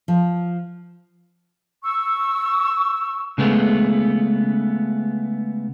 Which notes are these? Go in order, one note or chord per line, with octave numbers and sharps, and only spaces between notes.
F3
C#6 E6
C#3 G#3 A3 B3